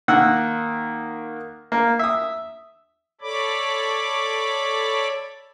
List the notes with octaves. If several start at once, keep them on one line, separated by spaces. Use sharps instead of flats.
D#3 A#3 F#5 E6 F#6
A#3
E5 D#6
A4 C#5 D5 B5 D6